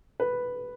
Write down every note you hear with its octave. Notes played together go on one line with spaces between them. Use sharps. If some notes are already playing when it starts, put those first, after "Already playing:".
B4